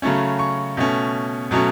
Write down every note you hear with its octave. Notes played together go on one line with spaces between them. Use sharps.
C#3 F#3 A3 C#4
C#6
B2 A3 C#4
B2 F#3 A3 C#4